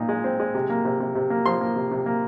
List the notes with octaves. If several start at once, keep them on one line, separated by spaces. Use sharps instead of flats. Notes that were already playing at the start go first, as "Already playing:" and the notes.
Already playing: A#2 D#4
G#3
C4
G#3
C3
A#3
C3
C3
C3
A#3
F3 C6
A#3
C3
C3
A#3